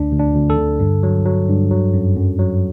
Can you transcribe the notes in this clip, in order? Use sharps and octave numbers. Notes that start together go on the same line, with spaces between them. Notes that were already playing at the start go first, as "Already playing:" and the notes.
Already playing: D2 D4
D2
D4
D2
A4
D3
G2
F#3
F#3
G2
F#3
F#2
F#2
F#3